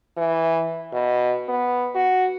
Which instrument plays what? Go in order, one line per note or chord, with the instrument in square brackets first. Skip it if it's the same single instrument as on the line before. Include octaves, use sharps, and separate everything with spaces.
[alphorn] E3
B2
B3
F#4